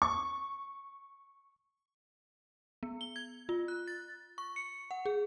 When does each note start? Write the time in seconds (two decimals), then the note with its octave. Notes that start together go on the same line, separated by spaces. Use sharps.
0.02 C#6
2.83 B3
3.01 G7
3.16 G#6
3.49 F4
3.68 F#6
3.88 A6
4.38 C#6
4.56 C#7
4.91 F#5
5.06 G#4